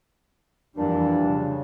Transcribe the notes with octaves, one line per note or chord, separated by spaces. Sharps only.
F2 A#2 E3 G3 D4
C#3